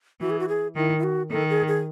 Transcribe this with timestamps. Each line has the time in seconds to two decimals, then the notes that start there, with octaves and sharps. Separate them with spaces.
0.21 E3 F#4
0.30 G#4
0.40 F#4
0.48 G#4
0.76 D#3 E4
0.98 E4
1.03 F#4
1.31 D#3 A4
1.50 G#4
1.68 G#4